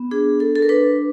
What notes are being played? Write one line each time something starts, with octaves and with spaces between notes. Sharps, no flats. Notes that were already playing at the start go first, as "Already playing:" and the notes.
Already playing: B3
D4 G#4
D4 A4
A4
A#4
D4 B4